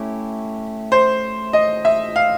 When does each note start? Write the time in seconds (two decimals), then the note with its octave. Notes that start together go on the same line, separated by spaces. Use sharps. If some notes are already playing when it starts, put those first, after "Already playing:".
Already playing: A3 C#4 E4 G4
0.92 C5
1.53 D#5
1.85 E5
2.16 F5